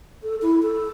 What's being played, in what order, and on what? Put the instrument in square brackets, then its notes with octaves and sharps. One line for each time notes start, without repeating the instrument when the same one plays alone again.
[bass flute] A4
E4
A4